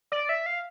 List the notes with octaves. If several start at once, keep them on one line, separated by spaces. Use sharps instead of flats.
D5
E5
F5